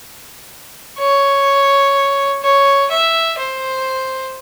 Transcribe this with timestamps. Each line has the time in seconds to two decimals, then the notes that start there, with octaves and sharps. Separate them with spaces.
0.99 C#5
2.43 C#5
2.91 E5
3.39 C5